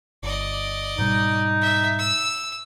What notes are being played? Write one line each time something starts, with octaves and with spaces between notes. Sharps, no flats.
G1 D5 D#5
G#2 B2 G3 D#4
E5
E6